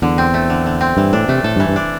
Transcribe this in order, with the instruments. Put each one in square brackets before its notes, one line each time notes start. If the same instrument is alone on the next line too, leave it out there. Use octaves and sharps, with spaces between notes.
[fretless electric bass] E2 [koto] D3
[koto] C4
A3
D3
D3
C4
[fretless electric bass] G2 [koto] E3
[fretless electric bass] A2 [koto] D4
[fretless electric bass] C3 [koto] A3
[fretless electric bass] A2 [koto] A4
[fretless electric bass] G2
[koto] E3
[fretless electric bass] G2
[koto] D4